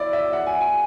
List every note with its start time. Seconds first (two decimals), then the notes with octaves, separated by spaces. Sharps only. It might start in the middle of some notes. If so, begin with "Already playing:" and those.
Already playing: E4 C#5 D5
0.13 E5
0.33 F#5
0.47 G#5
0.61 G#5